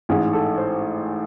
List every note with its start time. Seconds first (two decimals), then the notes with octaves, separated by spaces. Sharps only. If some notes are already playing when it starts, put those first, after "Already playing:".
0.09 A1 G#2 E3 G#4
0.33 A4
0.57 C5